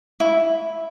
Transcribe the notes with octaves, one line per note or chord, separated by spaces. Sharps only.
E4